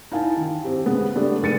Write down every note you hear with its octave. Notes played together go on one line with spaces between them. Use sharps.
D#4 E4 F5 G#5 A5
D#3
C4 G4
C#3 G#3 B3
G3 A3 B3 D4
F1 G#3 A6 C#7 D#7